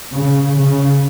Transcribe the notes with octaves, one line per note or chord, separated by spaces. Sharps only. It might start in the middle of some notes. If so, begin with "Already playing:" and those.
C#3
C#3